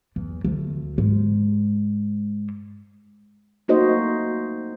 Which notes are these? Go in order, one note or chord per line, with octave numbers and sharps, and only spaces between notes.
E2
D2
G#2
A3 A#3 D#4 F#4 C5 D#5